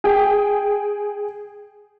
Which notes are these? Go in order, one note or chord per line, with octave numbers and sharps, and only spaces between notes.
G#4 G5